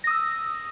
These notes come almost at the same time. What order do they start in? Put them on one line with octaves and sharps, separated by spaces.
A#6 D#6 E6